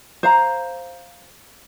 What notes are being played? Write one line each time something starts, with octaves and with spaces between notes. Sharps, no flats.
C5 F5 A#5